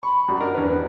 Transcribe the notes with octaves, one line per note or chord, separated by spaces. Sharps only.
B5 C#6
F#2 G3 F#4
D4 A#4 D#5
E2 D4 B4
B3